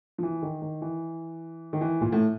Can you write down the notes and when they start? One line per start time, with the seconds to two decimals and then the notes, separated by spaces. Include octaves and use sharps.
0.18 F3
0.23 E3
0.42 D#3
0.62 D#3
0.81 E3
1.73 D#3
1.81 E3
2.01 A#2
2.12 A2